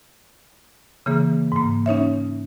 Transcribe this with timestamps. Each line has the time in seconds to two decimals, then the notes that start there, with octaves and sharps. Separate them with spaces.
1.06 C#3 E3 A#3 G#4
1.52 G#2 A#3
1.86 C#4 D#4 C#5 E5